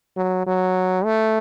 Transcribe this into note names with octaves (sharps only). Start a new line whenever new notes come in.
F#3
F#3
A3